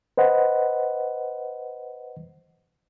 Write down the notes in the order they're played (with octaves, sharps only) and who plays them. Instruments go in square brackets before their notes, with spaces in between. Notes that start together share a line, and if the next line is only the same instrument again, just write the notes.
[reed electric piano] B4 C5 D#5 F#5